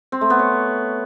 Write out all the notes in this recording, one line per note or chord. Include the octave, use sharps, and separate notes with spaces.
C4
A3
B3
C#5